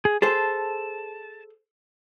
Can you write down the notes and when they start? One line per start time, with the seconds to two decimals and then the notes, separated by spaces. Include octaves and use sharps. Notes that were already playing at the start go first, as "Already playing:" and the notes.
0.05 G#4
0.22 G#4 A4 C5 A5